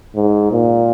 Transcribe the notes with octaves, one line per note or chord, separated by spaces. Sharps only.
G#2
A#2